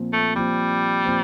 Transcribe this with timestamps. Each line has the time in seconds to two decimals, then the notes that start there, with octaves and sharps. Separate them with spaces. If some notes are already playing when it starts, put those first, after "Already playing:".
Already playing: A#2 F3 C4
0.13 A3
0.36 A#2 F3 G3 C4
1.05 A#2 F3 C4